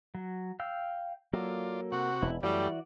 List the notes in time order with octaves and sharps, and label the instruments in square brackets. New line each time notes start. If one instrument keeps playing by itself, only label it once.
[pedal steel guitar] F#3
F5 G5 E6
[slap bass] F#3 [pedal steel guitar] A#3 A4 [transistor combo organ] F4 D5
[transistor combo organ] C3 F#5 [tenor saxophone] F#4
[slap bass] E1 [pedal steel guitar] E4
[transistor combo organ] F#2 A3 G4 [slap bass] E3 [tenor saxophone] G3 [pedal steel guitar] F#4 D5